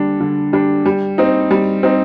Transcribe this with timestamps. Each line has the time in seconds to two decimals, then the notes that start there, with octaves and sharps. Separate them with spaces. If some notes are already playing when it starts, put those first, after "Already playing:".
Already playing: D3 G3 D4
0.20 D3
0.53 G3 D4
0.85 G3
1.18 C4 D#4
1.51 G3
1.83 C4 D#4